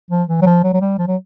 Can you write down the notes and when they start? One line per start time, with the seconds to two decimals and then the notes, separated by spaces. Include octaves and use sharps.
0.11 F3
0.29 E3
0.42 F#3
0.46 F3
0.64 F#3
0.74 F#3
0.81 G3
0.99 F3
1.08 F#3